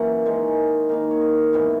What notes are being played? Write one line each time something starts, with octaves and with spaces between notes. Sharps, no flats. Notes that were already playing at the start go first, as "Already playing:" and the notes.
Already playing: F#2 E3 A#3 E5 F#5
D#3 G#3 C#4
D#3 A#3 D#4
C#5
D#5
G#2 E3 B3 E4